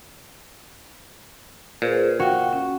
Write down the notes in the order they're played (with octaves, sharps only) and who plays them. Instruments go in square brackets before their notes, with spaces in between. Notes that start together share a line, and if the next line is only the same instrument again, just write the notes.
[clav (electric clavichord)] A#2 [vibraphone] G#4 B4 C5
[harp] F#4 [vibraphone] F5 G5
[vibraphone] C#4